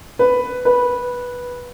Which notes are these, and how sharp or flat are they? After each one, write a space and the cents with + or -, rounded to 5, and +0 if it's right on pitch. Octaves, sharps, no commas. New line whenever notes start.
B4 +5
B4 -10